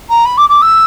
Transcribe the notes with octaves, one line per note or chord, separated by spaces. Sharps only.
A#5
B5
D6
D6
E6